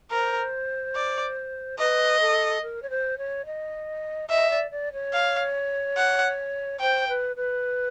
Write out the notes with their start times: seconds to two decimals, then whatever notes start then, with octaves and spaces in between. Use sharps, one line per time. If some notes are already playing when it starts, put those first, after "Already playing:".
0.11 A#4 C5
0.95 D5
1.79 B4 D#5
2.20 A4
2.62 A#4
2.82 C#5
2.90 C5
3.18 C#5
3.45 D#5
4.29 D#5 E5
4.50 D5
4.71 D5
4.92 C#5
5.13 F5
5.97 F#5
6.80 C5 G5
7.08 B4
7.36 B4